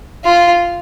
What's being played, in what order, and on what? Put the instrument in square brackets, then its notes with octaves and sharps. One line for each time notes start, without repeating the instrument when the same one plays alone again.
[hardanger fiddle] F4